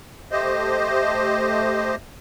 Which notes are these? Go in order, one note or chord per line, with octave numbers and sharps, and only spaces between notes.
A3 G4 C5 D#5